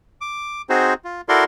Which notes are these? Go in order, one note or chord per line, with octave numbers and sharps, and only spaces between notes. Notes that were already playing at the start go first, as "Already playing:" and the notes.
D6
C4 D#4 F#4 G#4 C5
F4
E4 F#4 A4 A#4 D5 C6